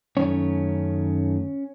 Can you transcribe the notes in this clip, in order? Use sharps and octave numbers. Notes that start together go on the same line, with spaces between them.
F#2 D#3 A3 C#4 C#5